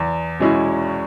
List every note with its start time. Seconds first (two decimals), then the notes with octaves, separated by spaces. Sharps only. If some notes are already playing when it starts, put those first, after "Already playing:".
Already playing: E2
0.39 B2 G#3 C#4 E4